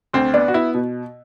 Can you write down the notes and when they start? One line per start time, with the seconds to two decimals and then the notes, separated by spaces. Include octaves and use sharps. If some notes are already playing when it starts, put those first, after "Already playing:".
0.13 D2 C4
0.34 B3 D4
0.48 F#4
0.54 B3 E4
0.74 B2